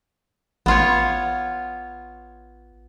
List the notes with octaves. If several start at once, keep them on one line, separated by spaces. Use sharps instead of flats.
A1 B3 F4 C#5